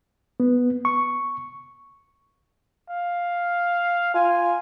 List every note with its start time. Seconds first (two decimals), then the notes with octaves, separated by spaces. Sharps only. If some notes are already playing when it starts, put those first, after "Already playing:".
0.40 B3
0.85 C#6
2.90 F5
4.14 F4 G#5